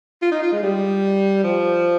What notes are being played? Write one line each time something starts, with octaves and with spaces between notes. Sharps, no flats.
F4
D#4
F4
G#3
G3
F3